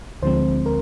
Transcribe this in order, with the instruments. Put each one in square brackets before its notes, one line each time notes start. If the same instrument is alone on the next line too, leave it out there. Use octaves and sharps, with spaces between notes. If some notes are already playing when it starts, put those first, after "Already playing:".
[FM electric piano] D2 D3 F3 G#3 C4 C5
A#4